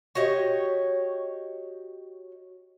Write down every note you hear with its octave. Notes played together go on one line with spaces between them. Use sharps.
F#4 G4 C#5 D#5